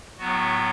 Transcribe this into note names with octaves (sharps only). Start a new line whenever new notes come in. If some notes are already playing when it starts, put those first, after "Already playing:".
A2 F#3 B3 F#4